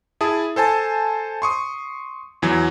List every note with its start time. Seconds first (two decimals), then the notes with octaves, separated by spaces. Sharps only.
0.21 E4 G#4 A5 D#6
0.56 A4 C5 G#5 A5
1.42 C6 C#6 D#6
2.42 E2 E3 F#3